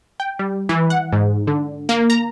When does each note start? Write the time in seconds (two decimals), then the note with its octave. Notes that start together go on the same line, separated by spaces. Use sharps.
0.20 G5
0.39 G3
0.69 E3
0.90 F#5
1.12 G#2
1.47 D3
1.89 A#3
2.10 A#5